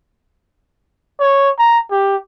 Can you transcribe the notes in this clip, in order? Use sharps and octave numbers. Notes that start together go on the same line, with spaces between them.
C#5
A#5
G4